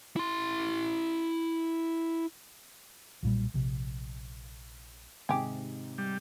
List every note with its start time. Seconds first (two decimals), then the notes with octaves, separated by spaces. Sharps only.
0.16 E4 C6
3.23 B1 A#2 G3
3.54 A#1 C3
5.29 G#2 C3 D#3 G4 G#4
5.98 G3